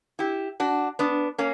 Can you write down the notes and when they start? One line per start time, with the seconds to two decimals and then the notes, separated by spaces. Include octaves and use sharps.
0.19 E4 G4
0.60 D4 F#4
0.99 B3 D4
1.38 A#3 C#4